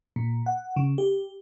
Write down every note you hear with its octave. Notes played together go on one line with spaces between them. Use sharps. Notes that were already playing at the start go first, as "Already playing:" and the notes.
A#2
F#5
C#3
G4